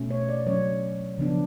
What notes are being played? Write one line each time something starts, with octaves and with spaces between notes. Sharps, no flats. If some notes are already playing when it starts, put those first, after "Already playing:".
Already playing: B2 A3 C#4
C#5
D5
F#3 C#4 C#5
C#3 F3 B3 D4